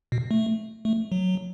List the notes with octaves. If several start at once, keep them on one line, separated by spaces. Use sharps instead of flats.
B2
A3
A3
F#3